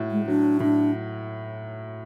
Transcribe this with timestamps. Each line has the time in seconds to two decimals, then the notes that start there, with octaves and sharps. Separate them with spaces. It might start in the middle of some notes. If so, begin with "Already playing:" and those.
Already playing: A2 F#4
0.11 G#3
0.27 F#3 D4
0.60 A2 D4